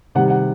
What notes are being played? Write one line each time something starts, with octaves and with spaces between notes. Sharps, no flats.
C3 D#3 G3 F#5
F#5